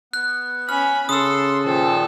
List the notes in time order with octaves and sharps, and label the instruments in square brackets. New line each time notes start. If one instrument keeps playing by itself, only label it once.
[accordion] B3 [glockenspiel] F#6
[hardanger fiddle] C#4 B5 [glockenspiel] F6
[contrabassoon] C#3 [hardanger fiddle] A4 [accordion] C6 [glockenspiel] D#6 E6
[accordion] A#2 D#3 F3 [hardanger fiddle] A4